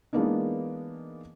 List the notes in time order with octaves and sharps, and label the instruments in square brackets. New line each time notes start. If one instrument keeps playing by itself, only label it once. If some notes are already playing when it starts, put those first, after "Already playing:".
[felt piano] E3 G#3 A#3 B3 D4 D#4